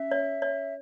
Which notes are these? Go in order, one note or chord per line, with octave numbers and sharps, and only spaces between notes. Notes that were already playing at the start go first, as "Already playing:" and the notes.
Already playing: C#4 E5
C#5
C#5